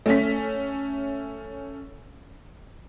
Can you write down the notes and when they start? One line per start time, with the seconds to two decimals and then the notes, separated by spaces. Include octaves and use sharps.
0.06 A3 C#4 B6